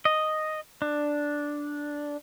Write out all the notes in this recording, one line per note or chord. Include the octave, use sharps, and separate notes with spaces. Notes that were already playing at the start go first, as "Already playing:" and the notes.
D#5
D4